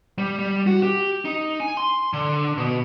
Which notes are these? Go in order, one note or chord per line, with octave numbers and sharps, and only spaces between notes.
G3
G3
F#4
G4
D#4
G#5
C6
D3
B2